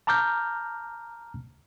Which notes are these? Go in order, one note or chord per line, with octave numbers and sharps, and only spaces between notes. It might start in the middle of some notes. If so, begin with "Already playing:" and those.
A5 A#5 D6 F6 G6